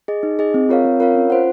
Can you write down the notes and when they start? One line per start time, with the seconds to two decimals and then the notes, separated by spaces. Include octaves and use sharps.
0.08 G#4 D#5
0.23 D#4
0.39 G#4 D#5
0.54 C4
0.69 F4 A#4 C#5 F5
0.85 C4
1.00 F4 A#4 C#5 F5
1.15 C#4
1.30 F4 C5 F#5